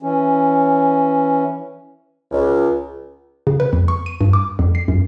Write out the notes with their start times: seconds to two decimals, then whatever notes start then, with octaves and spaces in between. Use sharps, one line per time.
0.03 E3 C#4
2.31 C#2
3.47 C#3
3.60 B4
3.73 F2
3.88 C#6
4.06 D#7
4.21 G2
4.33 D6
4.59 F2
4.75 C7
4.88 F#2